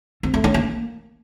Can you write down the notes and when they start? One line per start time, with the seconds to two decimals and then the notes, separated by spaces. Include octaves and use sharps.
0.23 C4
0.34 A3
0.44 C#4
0.54 A#3